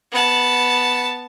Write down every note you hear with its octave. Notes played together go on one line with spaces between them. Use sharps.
B3 A5